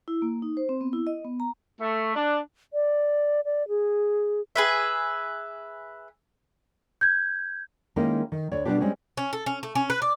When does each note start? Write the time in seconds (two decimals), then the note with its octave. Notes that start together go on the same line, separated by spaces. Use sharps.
0.08 E4
0.22 A#3
0.42 D#4
0.57 C5
0.69 C4
0.81 B3
0.93 E4
1.07 D#5
1.25 B3
1.40 A#5
1.80 A3
2.15 D4
2.73 D5
3.45 D5
3.68 G#4
4.56 G#4 B4 E5
7.01 G6 G#6
7.96 D#3 G#3 A#3 C#4 D#4 E4
8.32 D#3
8.51 D2 C#5 D5
8.65 B2 G3 G#3 B3 D4 G4
8.81 G3 G#3 C4 C#4
9.17 C#4
9.33 A4
9.46 C#4
9.63 A3
9.75 C#4
9.90 B4
10.02 D5